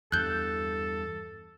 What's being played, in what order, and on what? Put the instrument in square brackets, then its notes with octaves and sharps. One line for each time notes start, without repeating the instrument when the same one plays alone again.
[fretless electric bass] E2 G2 [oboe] A4 [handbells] F#6 G6